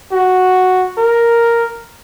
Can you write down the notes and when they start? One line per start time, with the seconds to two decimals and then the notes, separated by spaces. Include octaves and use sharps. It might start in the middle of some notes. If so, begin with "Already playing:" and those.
0.12 F#4
0.98 A#4